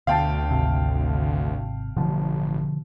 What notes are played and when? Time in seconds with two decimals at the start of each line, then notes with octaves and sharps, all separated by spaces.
0.07 D2 B2 F5 G5 A5
0.51 G#1 C3
1.96 A1 B2 D3 F3